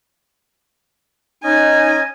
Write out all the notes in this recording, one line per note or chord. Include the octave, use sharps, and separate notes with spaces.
C#4 D#4 D#5 G#5